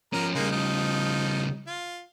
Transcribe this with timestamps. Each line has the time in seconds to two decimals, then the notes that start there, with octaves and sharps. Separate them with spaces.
0.13 F3 C#4 A#4
0.35 C#3 G3 G#3 A#3 D#4
0.51 F3 D#4
1.67 F4